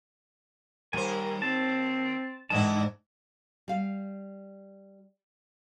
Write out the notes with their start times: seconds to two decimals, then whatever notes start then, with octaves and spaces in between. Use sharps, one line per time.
0.93 D#2 G3 A#4 C5 G#5
1.42 C4 A5
2.50 G#2 D3 E3 E4 D#5 A5
3.68 G3 F5